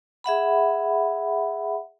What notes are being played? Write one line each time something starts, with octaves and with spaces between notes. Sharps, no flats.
G#4 E5 F#5 B5